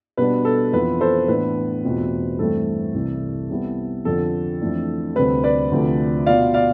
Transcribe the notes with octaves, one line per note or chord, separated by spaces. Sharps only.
B2 G3 B3 D4 B4
A4
F2 E3 B3 F4 B4
A4 C5
A2 E3 B3 D4 B4
E2 B2 A3 C4 F4
G2 E3 A3 C4 A4
C2 C3 E3
C3 G3 B3 E4
F2 D3 F3 A4
F2 E3 A3 D4
D2 C3 G3 C4 B4
B4 D5
D2 C3 F3 A3
B2 B3 F4 D5 F5
D5 F5